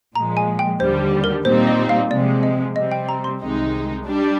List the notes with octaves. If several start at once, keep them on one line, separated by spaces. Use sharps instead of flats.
A#2 F3 G#3 A#5
G#5
G5
D#2 D3 G3 C5
A#4
A#2 G3 C4 D#4 C5
D#5
F5
C3 F3 G#3 D5
D#5
C3 G3 C4 D#5
G5
A#5
C6
C2 C3 D#3 G#3 D#4
G3 D4